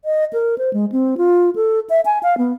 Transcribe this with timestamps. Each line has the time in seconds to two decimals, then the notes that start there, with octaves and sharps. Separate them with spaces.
0.05 D#5
0.33 A#4
0.58 C5
0.73 G#3
0.92 C4
1.18 F4
1.56 A4
1.90 E5
2.05 G#5
2.23 F5
2.38 B3